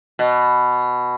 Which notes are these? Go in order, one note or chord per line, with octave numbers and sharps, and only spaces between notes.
B2